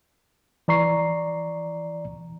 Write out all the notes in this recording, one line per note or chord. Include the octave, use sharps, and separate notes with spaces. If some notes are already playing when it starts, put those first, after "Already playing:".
E3 D5 A#5 C#6 C7